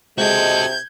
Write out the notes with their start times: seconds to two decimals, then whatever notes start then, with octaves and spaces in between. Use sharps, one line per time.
0.18 C3 G#3 F#4 A4 G6 G#6